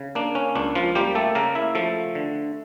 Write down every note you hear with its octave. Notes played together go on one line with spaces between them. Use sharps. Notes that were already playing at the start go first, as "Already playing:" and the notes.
Already playing: C#3
A#3 D4
C#4
C#2 D4
F3 F4
G3 A#3 G4
A3 A4
C#3 A#3 A#4
E4 E5
F3 A3 A4
D3